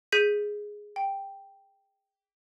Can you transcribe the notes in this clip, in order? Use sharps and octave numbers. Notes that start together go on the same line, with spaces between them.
G#4 G6 B6 D#7
G5